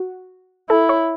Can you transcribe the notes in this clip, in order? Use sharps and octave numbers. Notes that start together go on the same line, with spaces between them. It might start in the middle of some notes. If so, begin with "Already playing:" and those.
Already playing: F#4
E4 A4
C#5